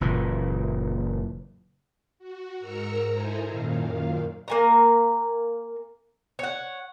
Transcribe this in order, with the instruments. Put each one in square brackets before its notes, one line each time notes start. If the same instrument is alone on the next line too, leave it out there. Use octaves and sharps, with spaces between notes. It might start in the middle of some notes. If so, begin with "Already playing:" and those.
[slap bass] F#1 A#2 E3
[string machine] F#4
G#2 A#4 A#5 E6 C#7
D#4 E4 A4 C5 G#5 A#5
F#2 A#2 D#3 F5
[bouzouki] A#3 G#5 A#5
C#5 F#5